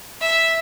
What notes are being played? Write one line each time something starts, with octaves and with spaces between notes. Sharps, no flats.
E5